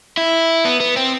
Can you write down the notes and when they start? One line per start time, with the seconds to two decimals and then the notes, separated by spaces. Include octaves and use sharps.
0.18 E4
0.65 B3
0.80 B3
0.96 C4